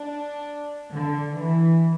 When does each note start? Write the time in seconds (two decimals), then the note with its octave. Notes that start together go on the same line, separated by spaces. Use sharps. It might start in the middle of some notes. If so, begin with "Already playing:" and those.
Already playing: D4
0.94 D3
1.38 E3